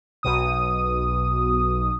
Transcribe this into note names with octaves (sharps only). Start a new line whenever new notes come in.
B1 B2 D#6